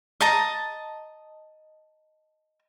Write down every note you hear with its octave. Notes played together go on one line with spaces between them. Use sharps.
D#5 A5 A#5